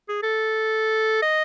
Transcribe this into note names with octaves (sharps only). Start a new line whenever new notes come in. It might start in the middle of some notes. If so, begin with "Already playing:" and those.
G#4
A4
D#5